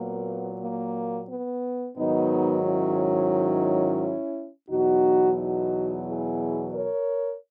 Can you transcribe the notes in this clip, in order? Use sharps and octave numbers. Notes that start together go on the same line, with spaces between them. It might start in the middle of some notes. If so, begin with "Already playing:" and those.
Already playing: A#2 F#3 A#3 B3
A#3
B3
G#2 D#3 F#3 B3 D#4
C#4 E4
E2 B2 F#3 D#4 F#4
D#4 F#4
E4 G#4
A#4 C#5